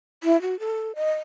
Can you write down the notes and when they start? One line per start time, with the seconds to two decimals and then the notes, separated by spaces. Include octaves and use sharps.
0.24 E4
0.42 F#4
0.60 A4
0.96 D#5